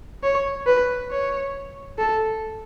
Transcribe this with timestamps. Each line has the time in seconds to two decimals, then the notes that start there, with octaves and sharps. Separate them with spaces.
0.23 C#5
0.67 B4
1.11 C#5
1.99 A4